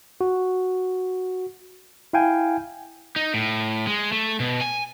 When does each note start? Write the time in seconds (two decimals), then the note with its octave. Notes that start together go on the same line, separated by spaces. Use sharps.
0.21 F#4
2.13 E4 F5 G5 G#5
3.16 D#4
3.34 A2
3.87 G#3
4.12 A3
4.40 B2
4.61 G#5